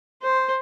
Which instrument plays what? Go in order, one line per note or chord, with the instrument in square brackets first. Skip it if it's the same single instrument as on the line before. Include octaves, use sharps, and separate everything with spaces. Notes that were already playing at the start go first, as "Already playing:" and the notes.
[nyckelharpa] C5